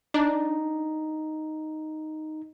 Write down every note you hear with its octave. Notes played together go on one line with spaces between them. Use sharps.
D4 D#4